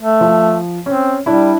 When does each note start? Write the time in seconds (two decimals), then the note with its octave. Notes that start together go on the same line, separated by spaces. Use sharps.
0.01 A3
0.21 F3
0.86 C4 C#4
1.26 G3 D4 E4